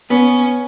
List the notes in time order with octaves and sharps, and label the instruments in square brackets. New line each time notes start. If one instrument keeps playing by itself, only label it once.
[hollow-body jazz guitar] B3 [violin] C#4